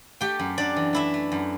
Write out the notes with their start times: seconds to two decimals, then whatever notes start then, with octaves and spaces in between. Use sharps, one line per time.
0.21 A3 G4 G5
0.39 F#2
0.58 F#2 D4 D5
0.76 E3
0.93 A3 E4 E5
1.14 A3
1.32 F#2